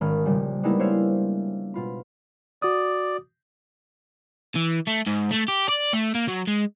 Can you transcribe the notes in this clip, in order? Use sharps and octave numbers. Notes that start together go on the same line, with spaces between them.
G#1 D#3 C#4 B5 F6
A#1 C#3 G3
G3 G#3 A#3 B3 D#4 E4
D4 C5 C#5 E5 F5
B2 F4 B5
F#4 D5 D#6
E3
A3
G#2
A3
G4
D5
A3
A#3
F#3
G#3